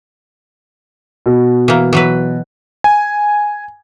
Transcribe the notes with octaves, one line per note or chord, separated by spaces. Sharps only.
B2
E3 A#3
E3 F#3 B4
G#5